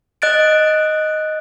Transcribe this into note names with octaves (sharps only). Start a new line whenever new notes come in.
D#5 F#6 A6 D7